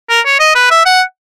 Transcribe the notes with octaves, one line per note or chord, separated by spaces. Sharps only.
A#4
C#5
D#5
B4
E5
F#5